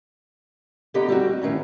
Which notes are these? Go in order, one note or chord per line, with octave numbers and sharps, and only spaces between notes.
D3 A#3 B3 G4 D#5 A#5
G3 C4 D#4 F#4
A2 D#3 C#4 A#5